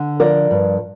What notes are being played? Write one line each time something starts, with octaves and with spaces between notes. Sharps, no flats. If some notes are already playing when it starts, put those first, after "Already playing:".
Already playing: D3
F3 A#4 D5
G2